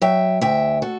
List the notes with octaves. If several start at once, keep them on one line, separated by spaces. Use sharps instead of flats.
F#3 E5 G5
D2 E5 G5
F#4 A4